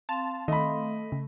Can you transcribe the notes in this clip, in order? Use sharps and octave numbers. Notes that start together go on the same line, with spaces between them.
C4 F5 A5 C6
D#3 A3 D#5 B5
C#3